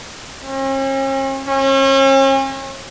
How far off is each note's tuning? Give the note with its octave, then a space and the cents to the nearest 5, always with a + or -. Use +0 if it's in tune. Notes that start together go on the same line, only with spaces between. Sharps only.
C#4 -45
C#4 -40